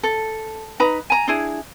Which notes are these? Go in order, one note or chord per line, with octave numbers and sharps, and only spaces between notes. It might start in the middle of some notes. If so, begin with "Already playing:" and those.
A4
D#4 B4 A#5 B5
G#5 A#5
D4 E4 G#4